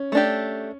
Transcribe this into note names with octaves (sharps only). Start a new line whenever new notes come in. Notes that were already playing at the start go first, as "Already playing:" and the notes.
Already playing: C#4
A3 D4 G4